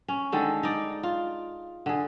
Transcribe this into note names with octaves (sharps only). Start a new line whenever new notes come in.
C#4
D3 D#3 G#3 A4
D#4 D5
F4
D3 G#4